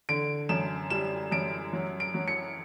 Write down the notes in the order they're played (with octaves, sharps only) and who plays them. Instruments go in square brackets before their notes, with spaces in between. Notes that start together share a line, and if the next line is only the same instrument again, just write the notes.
[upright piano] D3 D7
F#2 E7
G3 E7
F#2 D7
F#3
D7
F#3
C#7